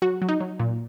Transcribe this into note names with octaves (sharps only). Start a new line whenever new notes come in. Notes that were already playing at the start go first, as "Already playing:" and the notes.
F#3 F#4
F#3
D#4
F#3
A#2